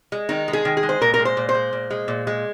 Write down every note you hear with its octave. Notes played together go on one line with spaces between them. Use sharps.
G#3
D#3 D#4
G#3
G#4
D#3
G#4
G#3
C5
A#2 A#4
A#4
G#3
C5
A#2
C5
G#3
A#2
G#3
A#2
G#3